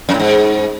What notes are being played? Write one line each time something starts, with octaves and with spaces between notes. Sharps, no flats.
F#2
A2
G#2